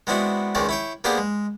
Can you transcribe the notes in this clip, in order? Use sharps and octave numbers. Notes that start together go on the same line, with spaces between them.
G#3 B3 C4 D4 E4 F#4
C#2 D#3 G#3 C4 C#4 D5
E4 C#5 G5
A#3 B3 D4 G4 G#4 C5
G#3